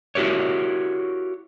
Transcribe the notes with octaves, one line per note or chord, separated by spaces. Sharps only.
E4 F#4 G4 A#4 C#5